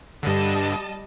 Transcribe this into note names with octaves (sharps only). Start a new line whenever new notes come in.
G2 D3 G3 D#5 A5